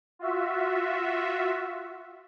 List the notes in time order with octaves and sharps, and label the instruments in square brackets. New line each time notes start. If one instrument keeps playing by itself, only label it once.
[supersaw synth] F4 F#4 E5